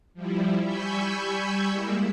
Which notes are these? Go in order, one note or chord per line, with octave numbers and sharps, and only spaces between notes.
F3 G3 E4
G3 G#5 B5 C#6 E6 G6
G3 G#3 A#3 E4